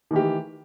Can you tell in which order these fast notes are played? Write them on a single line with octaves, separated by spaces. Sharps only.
D#3 E3 G4 A3